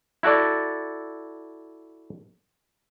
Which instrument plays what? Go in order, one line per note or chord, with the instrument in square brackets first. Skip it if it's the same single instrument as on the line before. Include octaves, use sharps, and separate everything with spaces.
[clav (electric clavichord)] E4 F#4 A4 D5